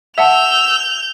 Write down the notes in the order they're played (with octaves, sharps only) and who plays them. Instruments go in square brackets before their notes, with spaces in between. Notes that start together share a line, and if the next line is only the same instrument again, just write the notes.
[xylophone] E5 F#5 A5 [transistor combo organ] E6 [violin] G6 F7